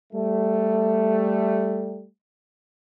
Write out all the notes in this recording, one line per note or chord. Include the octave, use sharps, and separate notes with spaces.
G3 A3